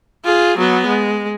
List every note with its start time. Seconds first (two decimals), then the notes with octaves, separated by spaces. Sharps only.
0.25 F4 G#4
0.58 F#3 B3
0.87 G#3